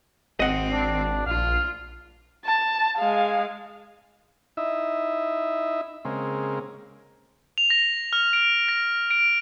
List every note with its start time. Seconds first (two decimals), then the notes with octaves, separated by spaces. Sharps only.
0.40 G#1 C4 D#5 F#5
0.71 D4
1.27 A#1 F4 F5
2.46 A5
2.98 G#3 F5
4.57 D#4 E4 E5
6.05 C#3 G#3 A#3 C4
7.58 F7
7.70 A#6
8.13 F6
8.33 D7
8.68 A#6
9.11 D7